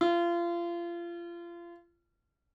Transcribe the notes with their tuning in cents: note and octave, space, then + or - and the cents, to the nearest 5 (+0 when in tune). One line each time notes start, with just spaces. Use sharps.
F4 -30